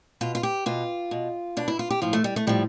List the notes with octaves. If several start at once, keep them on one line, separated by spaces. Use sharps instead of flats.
B2 F4
F4
G4
B2 F4
B2
B2 D4
E4
F4
G4
A2 F3 F4
A3
G3
A3
A2 F3 G3